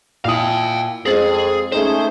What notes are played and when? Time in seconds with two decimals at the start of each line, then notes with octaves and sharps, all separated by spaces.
0.25 A#2 E4 F5 G5 D#6
1.06 F2 G#3 C4 G#4 A6
1.72 A3 C#4 D#4 G#4 C5